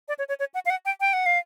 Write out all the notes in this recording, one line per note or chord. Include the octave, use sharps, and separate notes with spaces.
D5
C#5
C#5
C#5
F#5
F5
F#5
G5
G5
F#5
F5